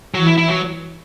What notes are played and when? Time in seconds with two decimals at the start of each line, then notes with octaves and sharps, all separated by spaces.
0.14 E3 F#3
0.27 E4
0.38 E4
0.48 F#3